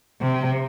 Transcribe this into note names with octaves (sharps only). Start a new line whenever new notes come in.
C3